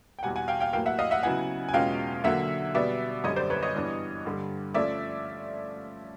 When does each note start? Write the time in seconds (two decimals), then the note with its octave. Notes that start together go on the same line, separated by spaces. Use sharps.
0.19 G5
0.23 E2 B2 G3 F#5 G#5
0.36 F#5 G#5
0.48 F5 G5
0.60 F5 G5
0.73 A2 F#3 A#3 F5 G5
0.86 E5 F#5
0.99 D#5 F5
1.11 E5 F#5
1.23 C#3 F#3 B3 E4 F#5 G#5
1.69 G#5
1.73 E2 B2 G#3 C#4 F4 F5 G5
2.24 D3 F#3 A#3 E5 F#5
2.75 B2 G3 B3 D5 E5
3.24 F#2 D3 G3 C#5 D#5
3.36 C5 D5
3.50 B4 C#5
3.63 C#5 D#5
3.74 G2 E3 G3 B3 D4
4.25 G2 D3 G3
4.74 F3 A3 C#4 D5 E5